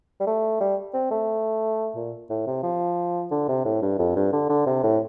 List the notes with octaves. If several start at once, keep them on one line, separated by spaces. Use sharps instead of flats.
G3
A3
G3
C4
A3
A#2
A2
C3
F3
D3
C3
A2
G2
F2
G2
D3
D3
C3
A2